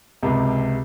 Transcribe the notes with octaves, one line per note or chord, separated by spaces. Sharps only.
C#2 G#2 C3